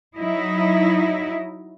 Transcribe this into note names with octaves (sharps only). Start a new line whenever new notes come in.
F#3 D#4 E4 D#5